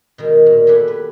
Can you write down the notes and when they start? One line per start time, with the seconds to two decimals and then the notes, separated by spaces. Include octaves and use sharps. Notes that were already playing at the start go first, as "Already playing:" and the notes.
0.18 B2 D#3 G#3
0.46 A#2
0.67 A3 G4 G#4 B4 F#5
0.88 B4